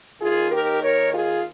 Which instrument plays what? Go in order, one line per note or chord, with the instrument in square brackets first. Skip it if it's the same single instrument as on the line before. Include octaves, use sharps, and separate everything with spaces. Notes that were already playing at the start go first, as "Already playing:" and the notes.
[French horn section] D#2 D#3 F4 G#4
G4 A#4
A#4 C#5
F4 G#4